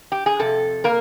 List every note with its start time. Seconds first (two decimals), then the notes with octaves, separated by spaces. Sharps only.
0.12 G4
0.26 G#4
0.39 F2 C3 A4
0.84 A#3 A#4